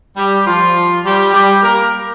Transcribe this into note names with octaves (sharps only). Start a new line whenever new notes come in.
G3 G4
F3 F4
G3 G4
G3 G4
A#3 A#4